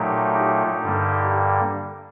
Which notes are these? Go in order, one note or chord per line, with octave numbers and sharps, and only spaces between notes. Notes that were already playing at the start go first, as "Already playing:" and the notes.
Already playing: A#2 F#3 A3 D#4 G4
D#4 G4
G2 D3 G3 A#3